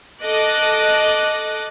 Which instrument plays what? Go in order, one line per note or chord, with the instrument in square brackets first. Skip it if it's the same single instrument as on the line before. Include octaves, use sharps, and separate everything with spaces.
[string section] A4 D#5 D6 F#6